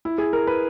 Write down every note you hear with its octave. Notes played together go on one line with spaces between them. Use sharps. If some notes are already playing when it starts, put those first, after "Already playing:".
E4
G#4
A#4
B4